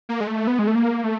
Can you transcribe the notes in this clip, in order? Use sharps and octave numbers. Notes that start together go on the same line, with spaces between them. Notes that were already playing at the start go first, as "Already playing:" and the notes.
A#3
G#3
A3
B3
G#3
A3
A#3
A3